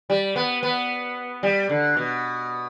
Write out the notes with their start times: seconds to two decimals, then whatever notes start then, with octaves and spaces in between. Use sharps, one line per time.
0.10 G3
0.36 B3
0.63 B3
1.43 G3
1.69 D3
1.97 B2